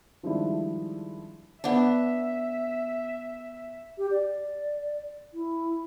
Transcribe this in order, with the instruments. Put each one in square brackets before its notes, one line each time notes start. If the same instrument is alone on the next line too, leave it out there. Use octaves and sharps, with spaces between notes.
[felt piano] D#3 F3 G3 G#3 D4 E4
[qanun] B3 D4 [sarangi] E5
[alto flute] G4
D5
E4